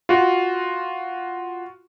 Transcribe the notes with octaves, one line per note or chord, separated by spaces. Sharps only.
F4 F#4